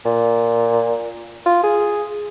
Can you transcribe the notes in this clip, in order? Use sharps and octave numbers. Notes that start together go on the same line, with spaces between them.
A#2
F4
G#4